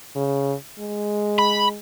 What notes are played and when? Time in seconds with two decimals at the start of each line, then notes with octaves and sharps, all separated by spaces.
0.15 C#3
0.79 G#3
1.39 B5